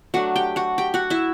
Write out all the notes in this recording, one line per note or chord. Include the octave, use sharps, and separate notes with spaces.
F#3 A3 D4 F#4 F#5
G4 G5
F#4 F#5
G4 G5
F#4 F#5
E4 E5